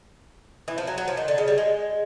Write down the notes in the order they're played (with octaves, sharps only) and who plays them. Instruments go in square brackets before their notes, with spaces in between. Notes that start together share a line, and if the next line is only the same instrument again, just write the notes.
[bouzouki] E3
F3
F#3
F#3
F3
D#3
D3
C#3
G3
G#3